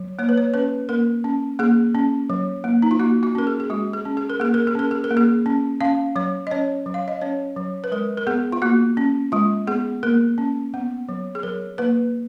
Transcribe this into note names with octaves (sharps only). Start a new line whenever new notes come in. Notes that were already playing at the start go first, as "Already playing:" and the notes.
Already playing: F#3
A#3 C#5
B4
C#5
C#4 B4
A#3 A#4
C#4
A#3 G#4
C#4
F#3
A#3
D#4
F4
A#3 F#4
F#4
C#4 A#4
G#4
G#4
G#3 F#4
G#4
C#4
G#4
A#4
A#3 G#4
A#4
G#4
C#4 A#4
G#4
A#4
A#3
G#4
C#4
C#4 F5
F#3 C#5
D#5
C#4 C#5
F#3
F5
D#5
C#4 C#5
F#3
B4
G#3 A#4
A#4
B3 G#4
F4
A#3 F#4
C#4
G#3 F4
B3 G#4
A#3 A#4
C#4
B3
F#3
G#4
F#3 A#4
A#3 B4